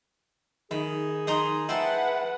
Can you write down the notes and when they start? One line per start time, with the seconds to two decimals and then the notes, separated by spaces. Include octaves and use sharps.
0.71 D#3 G#4 B5
1.27 D#3 A#5 C6 D#6
1.69 E4 B4 C5 F#5 G5 A5